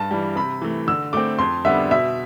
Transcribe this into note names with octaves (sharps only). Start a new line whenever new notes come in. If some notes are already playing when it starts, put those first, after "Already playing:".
Already playing: G2 A5
E3 G3
C3 B5
E3 A3
D3 E6
A3 C4 D6
F2 C6
D3 G3 B3 D4 E5
B2 E5